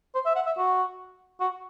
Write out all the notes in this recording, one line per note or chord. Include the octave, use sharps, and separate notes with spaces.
C5
E5
F#5
E5
F#4
F#4